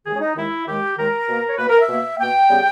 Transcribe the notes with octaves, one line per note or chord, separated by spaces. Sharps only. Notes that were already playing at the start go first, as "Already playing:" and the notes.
D#2 D#3 G#3 G#4
C#4
D#4
D#2 D#3 G#3 E4
D#2 D#3 G#3 G4
D#2 D#3 G#3 A#4
B2 A#3
C#5
B2 A#3 B4
A#4
E5
B2 A#3
B2 A#3 G5
C#3 G3 B3